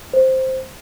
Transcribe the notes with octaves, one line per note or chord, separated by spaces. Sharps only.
C5